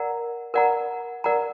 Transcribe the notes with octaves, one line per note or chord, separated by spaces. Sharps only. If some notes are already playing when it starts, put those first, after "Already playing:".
Already playing: A#4 D5 F#5 A#5
A#4 D5 F#5 A#5
A#4 D5 F#5 A#5